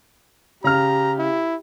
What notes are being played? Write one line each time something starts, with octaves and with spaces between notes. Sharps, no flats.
C#3 G4 A#5 F6
E4